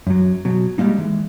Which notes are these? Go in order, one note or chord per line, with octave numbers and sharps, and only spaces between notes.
F#2 F#3
B2 F#3
G3 G#3 A#3 D#4
E3 G#3